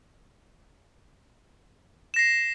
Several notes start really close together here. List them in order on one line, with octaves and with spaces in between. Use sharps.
E7 A#6 C7